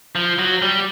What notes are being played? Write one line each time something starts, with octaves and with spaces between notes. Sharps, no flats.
F3
F#3
G3